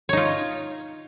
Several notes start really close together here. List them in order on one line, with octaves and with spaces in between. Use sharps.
C#5 D#4 F4